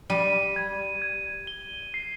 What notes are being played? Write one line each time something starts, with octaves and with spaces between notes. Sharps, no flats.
G3 D#7
G#6
G#6
G7
C7